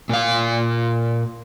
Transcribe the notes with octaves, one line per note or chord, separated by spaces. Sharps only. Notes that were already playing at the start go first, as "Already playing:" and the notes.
A#2 F5